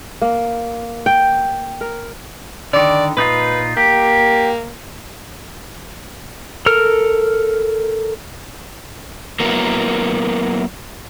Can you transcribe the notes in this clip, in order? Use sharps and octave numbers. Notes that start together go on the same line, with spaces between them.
A#3
G5
A#4
D3 D#3 D5
A#2 D#4 F4 B4
A#3 G4
A4 A#4 F6
F#3 A#3 B3 E4 A#4